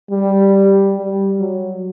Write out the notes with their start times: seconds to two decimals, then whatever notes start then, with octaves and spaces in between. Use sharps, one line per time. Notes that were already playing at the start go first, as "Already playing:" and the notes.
0.11 G3
0.97 G3
1.40 F#3